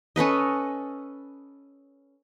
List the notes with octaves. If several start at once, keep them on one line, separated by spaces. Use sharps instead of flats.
C#4 A4 B4 D#5